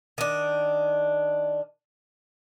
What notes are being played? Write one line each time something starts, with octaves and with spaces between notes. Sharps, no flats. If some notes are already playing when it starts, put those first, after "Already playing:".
D#3 D4